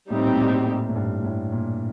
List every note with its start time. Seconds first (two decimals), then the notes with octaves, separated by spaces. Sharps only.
0.10 A2 G3 C4 D#4 G4
0.23 A#2
0.36 A2
0.49 A#2
0.62 A2
0.89 A2
0.96 G2
1.24 A2
1.52 A#2